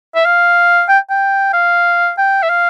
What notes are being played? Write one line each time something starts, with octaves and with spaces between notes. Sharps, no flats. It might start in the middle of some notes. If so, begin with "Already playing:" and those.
E5
F5
G5
G5
F5
G5
E5
F5